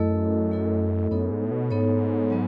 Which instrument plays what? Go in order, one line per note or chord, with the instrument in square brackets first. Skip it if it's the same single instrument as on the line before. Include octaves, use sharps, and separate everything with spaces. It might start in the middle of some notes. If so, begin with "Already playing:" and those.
Already playing: [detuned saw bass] F#2 [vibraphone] A3 E4 A4 D#5
[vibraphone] A3 E4 A4 D#5
[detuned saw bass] F#2 [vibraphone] B3 D#4 A4 C#5
[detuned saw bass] G#2
A2
B2
[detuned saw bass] G#2 [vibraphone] B3 D#4 A4 C#5
[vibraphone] F#3 B3